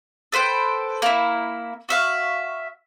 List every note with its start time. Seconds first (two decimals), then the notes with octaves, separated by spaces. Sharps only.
0.32 A4 B4 C5 G5
1.02 A#3 E4
1.89 F#4 E5 F5